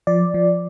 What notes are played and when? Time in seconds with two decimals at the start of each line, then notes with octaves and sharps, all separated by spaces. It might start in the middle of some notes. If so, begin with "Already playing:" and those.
0.07 F3 D5
0.34 F3